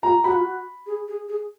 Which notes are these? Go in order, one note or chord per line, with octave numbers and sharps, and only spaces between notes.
F4 A#5
F#4 B5
F4
F#4
G#4
G#4
G#4